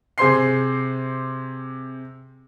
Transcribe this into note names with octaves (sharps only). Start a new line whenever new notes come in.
C3 G#4 C5 C6 C7